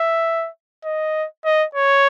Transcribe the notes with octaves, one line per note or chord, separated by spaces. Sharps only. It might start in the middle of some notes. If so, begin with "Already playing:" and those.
Already playing: E5
D#5
D#5
C#5